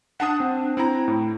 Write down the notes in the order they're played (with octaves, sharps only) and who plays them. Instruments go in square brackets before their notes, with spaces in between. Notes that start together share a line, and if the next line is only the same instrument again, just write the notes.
[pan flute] D4 [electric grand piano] F#5 A5 D#6
[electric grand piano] C4
[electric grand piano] C4 A#5 [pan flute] E4
[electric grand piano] A2